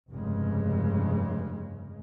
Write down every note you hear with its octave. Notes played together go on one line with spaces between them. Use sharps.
F1 G2 C#3 G#3